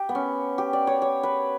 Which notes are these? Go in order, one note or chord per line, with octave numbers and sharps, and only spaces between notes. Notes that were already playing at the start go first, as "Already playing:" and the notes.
Already playing: G4
B3
C#4
G4
D5
C#5
C#5
B4